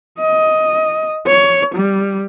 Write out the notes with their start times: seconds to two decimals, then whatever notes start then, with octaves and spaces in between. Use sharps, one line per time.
0.20 D#5
1.27 C#5
1.75 G3